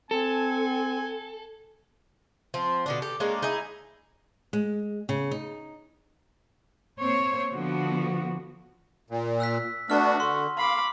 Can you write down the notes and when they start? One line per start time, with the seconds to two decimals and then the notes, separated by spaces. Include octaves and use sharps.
0.11 C4 A4 G#5
2.54 F3 C4
2.86 B2 D3 D4
3.02 G4 A4
3.20 G#3 A#3 C#4 D4
3.42 D#4 E4 G#4
4.53 G#3
5.09 C#3
5.31 D#4
7.00 A#3 C4 C5 C#5
7.53 D3 F3 B3 F#4
9.10 A#2
9.40 E6 F#6 B6
9.90 A3 B3 D4 F#4 C#6 F6
10.20 D3 C6
10.57 F5 B5 D6